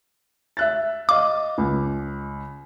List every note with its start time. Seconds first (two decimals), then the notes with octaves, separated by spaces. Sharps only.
0.57 E5 F#6 A6
1.09 D#5 F5 D6
1.58 C#2